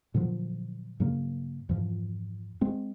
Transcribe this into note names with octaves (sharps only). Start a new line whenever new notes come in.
A#2 D3 F3 F#3
G2 C#3 F#3 A#3
F2 G#2 E3 F3
G#3 C4